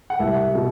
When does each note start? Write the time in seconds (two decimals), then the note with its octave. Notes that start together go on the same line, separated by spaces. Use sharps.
0.10 F#5
0.19 C2 E5
0.55 B2